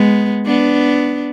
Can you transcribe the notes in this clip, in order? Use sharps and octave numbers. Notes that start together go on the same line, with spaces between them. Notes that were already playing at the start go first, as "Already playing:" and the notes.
Already playing: G#3 B3
B3 D4